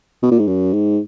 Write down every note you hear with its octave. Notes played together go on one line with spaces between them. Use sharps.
B2
A#2
G#2
F#2
G#2